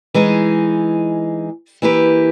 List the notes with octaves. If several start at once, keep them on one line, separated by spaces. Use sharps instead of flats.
E3 G#3 D#4 G#4
E3 A#3 E4 G4 B4